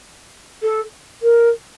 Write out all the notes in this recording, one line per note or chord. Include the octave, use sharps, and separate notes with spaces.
A4
A#4